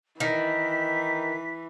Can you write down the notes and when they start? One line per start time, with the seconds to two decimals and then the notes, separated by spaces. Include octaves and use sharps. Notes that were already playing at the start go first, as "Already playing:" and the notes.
0.20 D#3 E3 B6